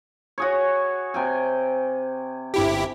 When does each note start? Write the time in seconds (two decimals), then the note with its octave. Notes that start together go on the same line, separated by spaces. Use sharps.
0.38 F#4 G#4 C#5
1.14 C3 G5 G#5
2.54 G1 E4 G4